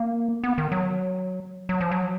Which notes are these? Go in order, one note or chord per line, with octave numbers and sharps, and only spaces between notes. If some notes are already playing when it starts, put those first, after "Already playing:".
Already playing: A#3
B3
D#3
F#3
F#3
F3
F#3